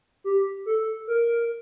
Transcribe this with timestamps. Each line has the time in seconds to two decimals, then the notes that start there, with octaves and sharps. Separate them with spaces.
0.24 G4
0.66 A4
1.07 A#4